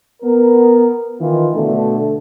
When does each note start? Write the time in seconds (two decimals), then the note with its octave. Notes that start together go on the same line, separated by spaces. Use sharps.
0.22 B3 A#4
1.20 D#3 E3 D#4 F4
1.53 B2 D3 A3